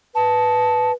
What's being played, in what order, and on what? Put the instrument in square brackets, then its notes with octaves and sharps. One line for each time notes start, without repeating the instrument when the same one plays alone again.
[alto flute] B4 [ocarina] A5